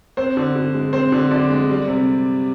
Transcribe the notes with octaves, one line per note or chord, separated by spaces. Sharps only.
C4 C5
D3
D3
G#3
C4 C5
D3
D3 D5
G#3
G3
C3